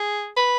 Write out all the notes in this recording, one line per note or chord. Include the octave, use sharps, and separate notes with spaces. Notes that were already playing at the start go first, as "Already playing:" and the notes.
Already playing: G#4
B4